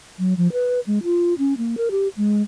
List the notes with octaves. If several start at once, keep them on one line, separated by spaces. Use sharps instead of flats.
F#3
F3
B4
G#3
F4
C#4
A#3
A#4
G4
G#3